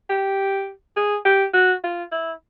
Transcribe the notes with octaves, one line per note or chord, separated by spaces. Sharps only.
G4
G#4
G4
F#4
F4
E4